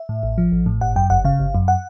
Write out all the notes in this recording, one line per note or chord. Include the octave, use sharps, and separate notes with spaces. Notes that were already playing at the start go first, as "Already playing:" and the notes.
Already playing: E5
A2
A1
F3
A1
A2
G1 F#5
F#2 G5
G1 F#5
C#3 F5
G1
F#2
F#5